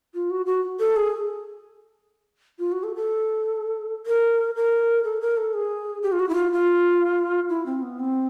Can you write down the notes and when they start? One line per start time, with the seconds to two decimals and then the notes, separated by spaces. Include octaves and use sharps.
0.14 F4
0.30 F#4
0.46 F#4
0.80 A4
0.96 G#4
2.59 F4
2.72 F#4
2.83 A4
2.96 A4
4.06 A#4
4.56 A#4
5.04 A4
5.21 A#4
5.37 A4
5.54 G#4
6.03 G4
6.12 F4
6.19 F#4
6.29 E4
6.35 F4
6.52 F4
7.50 E4
7.66 C4
7.82 B3
7.99 C4